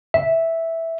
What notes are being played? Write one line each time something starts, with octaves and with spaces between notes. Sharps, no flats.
E5